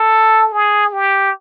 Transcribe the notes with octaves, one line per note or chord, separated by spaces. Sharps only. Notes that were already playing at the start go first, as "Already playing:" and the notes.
Already playing: A4
G#4
G4